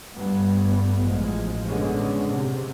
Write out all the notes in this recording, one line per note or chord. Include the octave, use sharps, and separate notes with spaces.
G2 A3 B3
A1 F3 G#3
D3 G#3 B3 C#4
C3